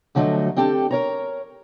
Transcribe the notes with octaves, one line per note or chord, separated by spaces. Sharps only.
D2 D3 F3 F#3 A3 D#5
C4 D4 G4 A4
A#4 C#5 A#5